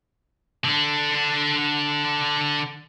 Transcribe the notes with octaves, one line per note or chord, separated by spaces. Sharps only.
D3 D4